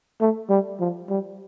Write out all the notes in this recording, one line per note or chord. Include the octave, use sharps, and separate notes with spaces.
A3
G3
F3
G3